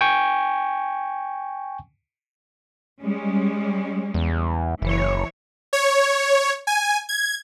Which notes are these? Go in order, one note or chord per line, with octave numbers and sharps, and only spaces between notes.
G5 G#5 C#6
G3 G#3 C#4
E2
F#1 E3 C#5
C#5
G#5
G#6